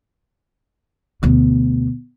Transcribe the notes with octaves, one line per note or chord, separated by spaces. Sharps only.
D2 B2